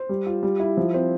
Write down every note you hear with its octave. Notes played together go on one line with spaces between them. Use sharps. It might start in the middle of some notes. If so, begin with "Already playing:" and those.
Already playing: C5
G3
F4
G3
E4
F3
C4